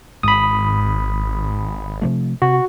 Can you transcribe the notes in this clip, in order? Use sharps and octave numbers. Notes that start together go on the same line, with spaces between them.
G#1 G#2 B5 D#6
C3 F3 A3
C3 F#4